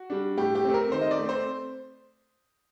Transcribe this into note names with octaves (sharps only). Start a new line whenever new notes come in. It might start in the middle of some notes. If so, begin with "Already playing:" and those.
Already playing: F#4
G3 D4
A2 G4
G4
A3 C4
A#4
D#3 C5
D#5
D5
A3 C4
C5